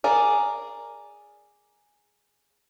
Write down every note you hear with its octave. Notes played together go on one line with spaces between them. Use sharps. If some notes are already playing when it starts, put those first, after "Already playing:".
G#4 A#4 D5